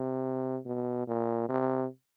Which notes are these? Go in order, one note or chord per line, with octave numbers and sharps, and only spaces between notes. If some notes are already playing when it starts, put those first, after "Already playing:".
Already playing: C3
B2
A#2
C3